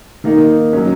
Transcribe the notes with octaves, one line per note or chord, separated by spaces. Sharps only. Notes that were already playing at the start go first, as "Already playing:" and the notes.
D#3 A#3 D#4
F#3 C#4